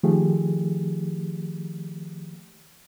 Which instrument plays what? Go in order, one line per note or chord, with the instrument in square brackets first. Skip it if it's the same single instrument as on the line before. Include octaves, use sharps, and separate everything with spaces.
[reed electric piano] D#3 F3 A3 G4 G#4